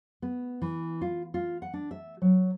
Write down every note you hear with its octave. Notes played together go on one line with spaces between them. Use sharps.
B3
E3
F4
F4
F#5
D4
E5
F#3